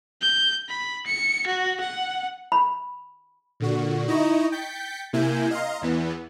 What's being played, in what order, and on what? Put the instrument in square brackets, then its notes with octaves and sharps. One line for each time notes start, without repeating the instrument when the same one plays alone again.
[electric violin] G6
B5
C#7
F#4
F#5
[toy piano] B5
[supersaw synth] A#2 D3 F#4
D#4 E4 D#5 A#5 C#6
G5 G6 A6 B6 C#7
C3 A#3 E4 G#5 G6
D#5 F5 A#5 C6
E2 E3 B3